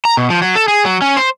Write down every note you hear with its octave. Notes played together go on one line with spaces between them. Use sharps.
A#5
B2
F3
F#3
A4
G#4
F#3
C#4
C5